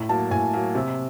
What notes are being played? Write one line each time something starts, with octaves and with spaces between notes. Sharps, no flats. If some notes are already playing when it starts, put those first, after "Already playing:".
Already playing: A2
F#3 A#3 A5
A2 G#5
F#3 A#3
C3